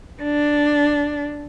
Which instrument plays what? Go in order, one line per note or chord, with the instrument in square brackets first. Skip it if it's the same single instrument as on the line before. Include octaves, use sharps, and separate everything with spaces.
[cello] D4